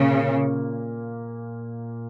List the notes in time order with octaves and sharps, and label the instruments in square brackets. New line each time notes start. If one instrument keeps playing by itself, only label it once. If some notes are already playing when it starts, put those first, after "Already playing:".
Already playing: [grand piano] A#2 A#3 [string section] C#3